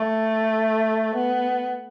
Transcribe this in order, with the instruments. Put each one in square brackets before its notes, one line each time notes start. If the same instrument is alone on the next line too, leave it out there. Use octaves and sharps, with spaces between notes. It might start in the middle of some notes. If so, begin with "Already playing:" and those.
Already playing: [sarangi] A3
B3